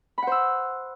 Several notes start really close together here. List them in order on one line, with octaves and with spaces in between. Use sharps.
B5 F#5 C5 E6